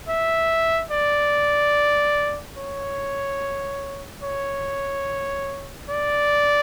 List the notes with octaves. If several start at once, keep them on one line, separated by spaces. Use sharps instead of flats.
E5
D5
C#5
C#5
D5